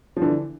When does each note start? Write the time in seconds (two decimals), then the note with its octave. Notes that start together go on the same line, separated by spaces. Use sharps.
0.17 F3
0.22 D3 E3